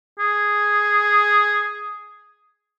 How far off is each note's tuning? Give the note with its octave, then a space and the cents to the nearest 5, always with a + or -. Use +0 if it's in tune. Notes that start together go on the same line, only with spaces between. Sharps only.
G#4 +0